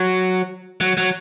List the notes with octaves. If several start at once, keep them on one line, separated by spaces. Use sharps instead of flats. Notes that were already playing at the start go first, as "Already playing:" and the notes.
Already playing: F#3
F#3
F#3